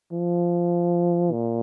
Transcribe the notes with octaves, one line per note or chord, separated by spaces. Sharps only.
F3
A#2